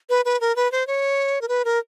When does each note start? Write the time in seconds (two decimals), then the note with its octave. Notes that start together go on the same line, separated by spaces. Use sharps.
0.10 B4
0.25 B4
0.41 A#4
0.56 B4
0.72 C5
0.87 C#5
1.41 A#4
1.48 B4
1.65 A#4